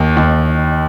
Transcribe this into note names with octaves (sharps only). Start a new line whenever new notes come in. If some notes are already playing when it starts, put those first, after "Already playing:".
Already playing: D#2
D#2